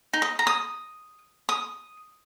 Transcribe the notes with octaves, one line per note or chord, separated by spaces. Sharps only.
D#4
D#5
A#5
D#6
D#6